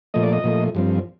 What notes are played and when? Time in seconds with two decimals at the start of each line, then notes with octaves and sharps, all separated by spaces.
0.14 A#2 F3 A3 D#5
0.23 D5
0.33 D#5
0.44 A#2 F3 A3
0.75 G2 F3 C4